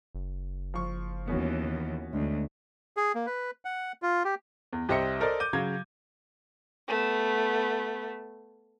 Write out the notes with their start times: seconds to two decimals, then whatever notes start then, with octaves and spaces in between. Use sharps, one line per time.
0.15 F#1
0.74 F3 C#6
1.28 D#2 E3 B3 C#4 F#4
1.65 D#3
2.13 D2 G#3
2.97 G#4
3.15 A#3
3.27 B4
3.65 F#5
4.02 F4
4.25 G4
4.73 E2
4.89 C2 G4 C5 D#5 E5 C#7
5.20 A4 A#4 C5 D5 D#5
5.40 D6 G6 D#7
5.53 C#3 F#3 F#4 F5 G#6
6.88 A3 B3